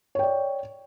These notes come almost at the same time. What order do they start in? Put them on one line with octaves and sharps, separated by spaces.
C#5 G5 D5